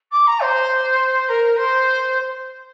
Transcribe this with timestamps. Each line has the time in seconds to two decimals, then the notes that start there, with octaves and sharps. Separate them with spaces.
0.11 D6
0.26 A#5
0.40 C5
1.28 A#4
1.56 C5